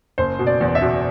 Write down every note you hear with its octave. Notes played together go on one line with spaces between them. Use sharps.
F#1 C5
B2
D5
E2
E5
B2